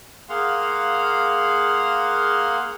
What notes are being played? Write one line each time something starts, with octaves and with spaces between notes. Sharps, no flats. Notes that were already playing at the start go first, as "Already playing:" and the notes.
A#3 G#4 F5 F#5 C6